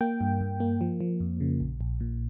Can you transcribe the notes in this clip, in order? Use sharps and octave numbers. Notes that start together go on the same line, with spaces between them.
A#3 G5
G2
G2
A#3
F3
F3
F2
C#3
A#1
A#1
A#2